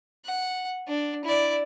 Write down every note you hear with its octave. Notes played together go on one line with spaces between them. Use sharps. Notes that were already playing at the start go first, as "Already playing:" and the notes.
F#5
D4
E4 D5